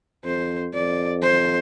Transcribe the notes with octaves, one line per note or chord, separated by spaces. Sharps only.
F2 C5
F2 D5
C5